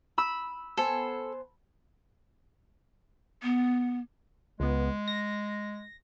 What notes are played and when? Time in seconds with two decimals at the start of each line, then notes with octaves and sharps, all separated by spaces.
0.18 B5 E6
0.77 B3 A4 C5 G#5
3.43 B3
4.60 C#2 G#3 B3
5.08 A#6